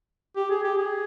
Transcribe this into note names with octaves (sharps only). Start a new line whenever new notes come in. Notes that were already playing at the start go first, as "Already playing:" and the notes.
G4
G#4
G4
G#4